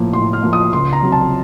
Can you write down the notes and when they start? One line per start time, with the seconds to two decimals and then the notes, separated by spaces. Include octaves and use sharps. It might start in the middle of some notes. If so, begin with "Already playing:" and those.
Already playing: A2 F3 A#3
0.13 A2 C6
0.33 F6
0.43 F3 A#3
0.53 D#6
0.73 C#2 C6
0.93 A#5
1.02 C3 F#3
1.12 A5